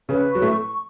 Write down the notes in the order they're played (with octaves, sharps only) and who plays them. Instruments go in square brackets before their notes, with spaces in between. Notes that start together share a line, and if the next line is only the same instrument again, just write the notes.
[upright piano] C#3 C#4 [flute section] B4
[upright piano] F#3 [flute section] C#6
[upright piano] A2 A3
[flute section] C#6